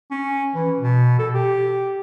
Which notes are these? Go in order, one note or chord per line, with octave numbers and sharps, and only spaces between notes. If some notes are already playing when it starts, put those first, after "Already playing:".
C#4
E3
B2
A4
G4